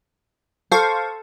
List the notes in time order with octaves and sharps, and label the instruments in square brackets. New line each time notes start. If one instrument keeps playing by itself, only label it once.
[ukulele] A4 [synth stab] C5 F5 C#6